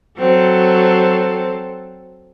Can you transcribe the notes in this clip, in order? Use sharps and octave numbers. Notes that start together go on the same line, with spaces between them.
F#3 C4 A4